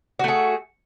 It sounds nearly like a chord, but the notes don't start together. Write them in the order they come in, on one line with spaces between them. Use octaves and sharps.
F#4 A3 G#4